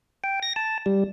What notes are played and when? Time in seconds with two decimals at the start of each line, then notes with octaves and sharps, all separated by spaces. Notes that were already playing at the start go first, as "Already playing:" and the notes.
0.24 G5
0.43 A#6
0.56 A5
0.86 G3